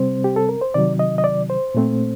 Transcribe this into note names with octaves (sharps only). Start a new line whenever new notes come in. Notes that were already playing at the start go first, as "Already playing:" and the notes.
Already playing: C3 G3 C4 C5
G4
A4
A#4
C5
C3 D#3 F#3 D5
D#5
D#5
D5
C5
A#2 A3 C4